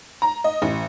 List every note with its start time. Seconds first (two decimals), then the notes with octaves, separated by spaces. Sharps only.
0.22 A#5
0.44 D#5
0.62 A1